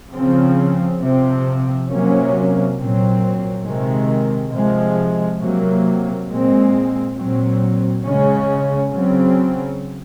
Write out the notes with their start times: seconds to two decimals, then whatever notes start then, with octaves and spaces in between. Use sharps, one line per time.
0.13 C#3 F3 C4
1.01 C3 F3 C4
1.89 C3 F#3 A#3 C#4
2.77 A#2 F#3 C4
3.65 C3 D#3 G#3
4.52 C3 F3 G#3
5.40 C3 F#3 A#3
6.28 A#2 G#3 C4
7.16 A#2 F#3 C4
8.04 C#3 G#3 C#4
8.92 C#3 F#3 C4